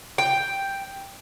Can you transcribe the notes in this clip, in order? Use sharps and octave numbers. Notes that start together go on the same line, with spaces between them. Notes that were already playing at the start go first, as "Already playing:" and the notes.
G5